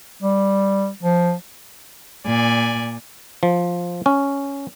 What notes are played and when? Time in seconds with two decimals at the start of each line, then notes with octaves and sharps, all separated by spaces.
0.23 G3
1.03 F3
2.26 A#2 D5 G#5
3.43 F3
4.06 C#4